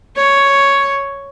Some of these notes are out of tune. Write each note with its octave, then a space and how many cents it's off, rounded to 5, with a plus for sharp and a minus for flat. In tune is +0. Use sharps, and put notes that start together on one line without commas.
C#5 +5